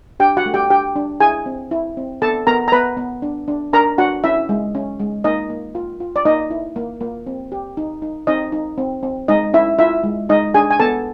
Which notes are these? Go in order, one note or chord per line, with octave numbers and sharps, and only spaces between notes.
D4 G4 G5
F#4 F#5
A3
G4 G5
D4 G4 G5
D4
E4 G#4 G#5
C4
E4
C4
B3 A4 A5
B3 A#4 A#5
A#5
B3 B4 B5
B3
D4
D4
D4 A#4 A#5
D4 F#4 F#5
C#4 E4 E5
G#3
C#4
G#3
A#3 D#4 D#5
A#3
F4
F4
D5
A#3 D#4 D#5
E4
A#3
A#3
C4
G4
D#4
D#4
C4 D#4 D#5
D#4
C4
C4
G#3 D#4 D#5
C#4 E4 E5
E4 F4 E5
G#3
G#3 D#4 D#5
D4 G#4 G#5
G#5
B3 A4 A5